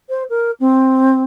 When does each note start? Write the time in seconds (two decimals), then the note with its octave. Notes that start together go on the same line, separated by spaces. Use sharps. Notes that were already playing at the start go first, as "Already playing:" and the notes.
0.09 C5
0.30 A#4
0.60 C4